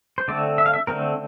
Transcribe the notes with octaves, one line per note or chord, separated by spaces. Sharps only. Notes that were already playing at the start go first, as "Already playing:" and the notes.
C5
D3 A3 C4 D5
E5
F5
E5
D3 A3 C4 A#4